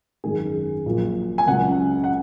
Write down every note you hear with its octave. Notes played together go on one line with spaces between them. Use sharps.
G#1 F#2 D#3 F#3 G#4
A#1 A#2 F#3
G#5
C#2 C#3 F#3 F#5
F#5